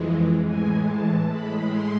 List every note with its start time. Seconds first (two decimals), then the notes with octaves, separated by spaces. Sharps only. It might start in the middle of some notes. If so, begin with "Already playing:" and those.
Already playing: F2 E3 G#3
0.42 A2 E3 G#3 G#5
0.84 A5
1.27 A2 G#3 B5
1.69 C6